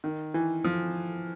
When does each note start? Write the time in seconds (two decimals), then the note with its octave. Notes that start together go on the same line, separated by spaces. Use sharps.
0.04 D#3
0.34 E3
0.64 F3